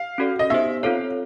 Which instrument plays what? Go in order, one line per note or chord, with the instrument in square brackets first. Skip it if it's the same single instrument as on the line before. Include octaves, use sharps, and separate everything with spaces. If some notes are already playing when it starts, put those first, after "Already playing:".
Already playing: [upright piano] F5
[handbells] C#4 F#4 A4 D5
[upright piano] D#5
[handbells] B3 D#4 G4 C5 [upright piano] E5
[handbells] C4 F4 A4 C#5 [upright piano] F5